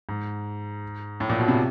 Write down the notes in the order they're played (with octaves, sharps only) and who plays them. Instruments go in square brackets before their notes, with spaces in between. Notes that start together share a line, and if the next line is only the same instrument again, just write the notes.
[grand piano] G#2
A2
A#2
B2
C3